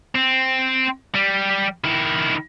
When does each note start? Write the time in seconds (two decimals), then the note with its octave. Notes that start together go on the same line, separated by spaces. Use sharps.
0.15 C4
1.15 G3
1.84 D#3 E4